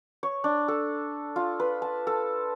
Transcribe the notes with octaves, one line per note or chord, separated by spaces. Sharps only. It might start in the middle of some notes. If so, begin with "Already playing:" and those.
C#5
D4
A4
F4
B4
A5
A4